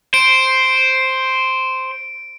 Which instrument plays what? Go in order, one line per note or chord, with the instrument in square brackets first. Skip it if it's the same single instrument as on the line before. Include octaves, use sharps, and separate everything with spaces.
[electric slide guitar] C5 [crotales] D7